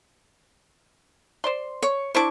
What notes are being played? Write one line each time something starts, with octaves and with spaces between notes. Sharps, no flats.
C5 D5 C6
C#5
D4 E4 C5 C#6 D6